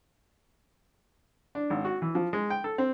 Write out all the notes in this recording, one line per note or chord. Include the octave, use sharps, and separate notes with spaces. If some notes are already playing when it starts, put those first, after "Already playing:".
D4
G#1
F#4
E3
F3
G#3
G5
A4
C4